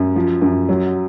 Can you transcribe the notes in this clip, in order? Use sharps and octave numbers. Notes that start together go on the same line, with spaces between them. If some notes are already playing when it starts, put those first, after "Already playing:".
Already playing: F#2
F3
F#2
F#3